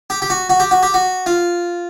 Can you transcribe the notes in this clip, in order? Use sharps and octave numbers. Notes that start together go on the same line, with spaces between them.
G4
G4
F#4
F#4
G4
F#4
G4
F#4
F4